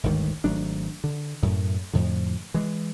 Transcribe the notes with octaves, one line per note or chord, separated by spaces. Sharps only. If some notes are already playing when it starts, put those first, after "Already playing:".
G1 D2 G#2 D#3
G#1 F#3 A3 D4
D3
F#2 A2 A3
F2 A2 D3
E3 G#3